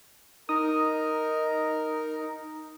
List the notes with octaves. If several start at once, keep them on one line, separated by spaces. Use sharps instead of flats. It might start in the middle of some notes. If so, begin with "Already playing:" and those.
D#4 A#4 D#6